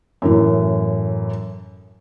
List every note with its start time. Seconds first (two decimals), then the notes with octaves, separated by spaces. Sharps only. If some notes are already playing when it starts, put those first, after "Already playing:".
0.22 F#2 A2 E3